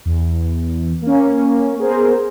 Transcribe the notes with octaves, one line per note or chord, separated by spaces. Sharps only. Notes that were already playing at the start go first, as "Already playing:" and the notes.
E2
A#3 C#4
B3 G#4 A#4 C5